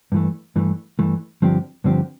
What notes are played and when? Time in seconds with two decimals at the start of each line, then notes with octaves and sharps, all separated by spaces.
0.12 G2 E3 A3
0.56 G2 E3 A3
0.99 G2 E3 A3
1.42 G2 D3 F3 C4 G4
1.84 G2 D3 F3 C4 G4